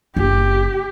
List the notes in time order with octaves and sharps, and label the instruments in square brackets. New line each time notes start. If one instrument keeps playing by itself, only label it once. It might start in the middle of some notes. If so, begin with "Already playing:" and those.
[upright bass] F#1 D4 [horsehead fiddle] G4